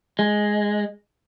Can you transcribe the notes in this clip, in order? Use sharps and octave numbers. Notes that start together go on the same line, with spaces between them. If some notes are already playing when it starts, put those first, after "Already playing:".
G#3